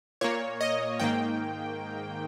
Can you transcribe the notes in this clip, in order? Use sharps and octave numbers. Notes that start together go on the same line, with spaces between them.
A#2 A#3 C#5
D#5
G#2 D#3 A#3 G5